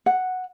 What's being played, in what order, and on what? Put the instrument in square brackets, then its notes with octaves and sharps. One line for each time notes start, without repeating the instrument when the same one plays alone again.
[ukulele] F#5